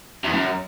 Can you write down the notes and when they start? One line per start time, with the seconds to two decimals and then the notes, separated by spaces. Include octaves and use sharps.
0.24 E2
0.33 F#2